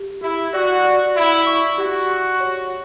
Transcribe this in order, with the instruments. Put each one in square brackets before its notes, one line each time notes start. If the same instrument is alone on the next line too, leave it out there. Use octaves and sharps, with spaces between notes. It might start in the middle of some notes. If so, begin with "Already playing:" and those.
Already playing: [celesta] G4
[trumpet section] E4 [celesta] G4
[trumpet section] F#4 [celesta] D5
[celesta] D5
[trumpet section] E4 [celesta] D5
[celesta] C#6
[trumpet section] F#4 [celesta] G4
[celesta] C#6
C#5